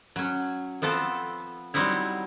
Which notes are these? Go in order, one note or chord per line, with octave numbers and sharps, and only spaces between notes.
F#3 C#4
F3 B3 C4 A4
F#3 G3 C4 D#4 E4